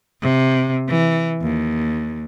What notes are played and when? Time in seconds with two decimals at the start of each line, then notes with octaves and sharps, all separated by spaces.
0.22 C3
0.89 E3
1.42 D#2